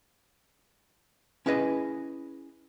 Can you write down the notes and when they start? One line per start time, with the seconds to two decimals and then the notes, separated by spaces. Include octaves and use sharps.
1.46 C#4 E4 G#4 B4 D#5